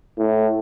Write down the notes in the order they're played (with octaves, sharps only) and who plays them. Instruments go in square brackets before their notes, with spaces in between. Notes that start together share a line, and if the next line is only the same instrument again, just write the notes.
[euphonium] A2